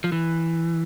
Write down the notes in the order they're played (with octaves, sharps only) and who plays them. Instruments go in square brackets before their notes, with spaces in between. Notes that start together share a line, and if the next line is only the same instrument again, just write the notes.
[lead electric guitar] F3
E3